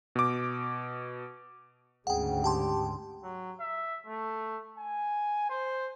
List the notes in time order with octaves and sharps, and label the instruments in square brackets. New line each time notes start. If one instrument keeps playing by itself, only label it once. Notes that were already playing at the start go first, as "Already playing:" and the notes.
[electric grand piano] B2 D6
[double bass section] D2 G#2 C#3 [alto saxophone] G#4 [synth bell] F#5 G5
[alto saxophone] G4 [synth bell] G5 A5 C6
[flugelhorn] F#3
E5
A3
G#5
C5